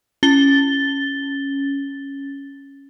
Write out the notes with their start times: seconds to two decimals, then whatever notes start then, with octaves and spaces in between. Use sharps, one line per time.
0.23 C#4 A6 G7